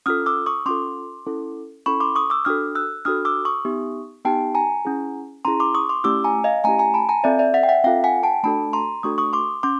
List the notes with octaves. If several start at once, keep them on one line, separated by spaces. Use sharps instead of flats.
C#4 F4 A4 D#6 F6
D6 E6
C#6 D#6
C#4 F4 A4 C6 D6
C#4 E4 A4
C#4 E4 A4 B5 C#6
C6 D6
C#6 D#6
D6 E6
D4 F#4 A4 D#6 F6
E6 F#6
D4 F#4 A4 D#6 F6
D6 E6
C#6 D#6
B3 D#4 G4
B3 D#4 G4 G5 A5
G#5 A#5
C#4 E4 G#4
C#4 E4 G#4 A#5 C6
C6 D6
C#6 D#6
C6 D6
A3 C#4 E4 G4 D6 E6
G#5 A#5
D#5 F5
A3 C#4 E4 G4 G#5 A#5
G#5 A#5
A5 B5
G#5 A#5
C4 F4 A4 D5 E5
D5 E5
E5 F#5
G5
E5 F#5
C4 F4 A4 F5 G5
F#5 G#5
G5 A5
A3 D4 F#4 A4 A5 B5
A#5 C6
A3 D4 F#4 A4 C#6 D#6
C#6 D#6
C6 D6
C#4 C6 D6